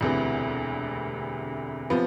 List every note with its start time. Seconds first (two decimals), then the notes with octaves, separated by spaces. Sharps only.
0.01 E1 D2 C3 E3
1.90 C3 F3 B3